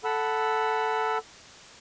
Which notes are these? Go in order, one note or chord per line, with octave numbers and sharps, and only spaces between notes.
A4 F#5 B5 E6